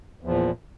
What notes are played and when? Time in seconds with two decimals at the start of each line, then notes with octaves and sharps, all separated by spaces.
0.21 E2
0.24 F3
0.28 A#2